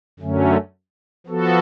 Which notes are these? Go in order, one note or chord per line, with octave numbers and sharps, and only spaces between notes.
F#2 D3 F#3 A3 C#4
F3 B3 F#4 A4